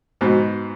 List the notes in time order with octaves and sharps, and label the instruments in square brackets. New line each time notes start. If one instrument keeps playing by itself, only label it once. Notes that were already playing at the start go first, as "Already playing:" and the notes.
[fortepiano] G#2 B2